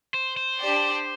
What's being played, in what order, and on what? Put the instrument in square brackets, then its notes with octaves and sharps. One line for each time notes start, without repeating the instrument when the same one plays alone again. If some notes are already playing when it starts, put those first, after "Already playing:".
[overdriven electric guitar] C5
C5
[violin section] D4 G4 D5